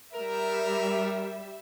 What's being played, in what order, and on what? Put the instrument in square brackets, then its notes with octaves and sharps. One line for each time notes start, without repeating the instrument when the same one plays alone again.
[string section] G3 E5 [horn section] A#4